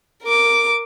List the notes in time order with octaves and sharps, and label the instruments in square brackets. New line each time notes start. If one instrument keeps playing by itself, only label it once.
[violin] A#4 D6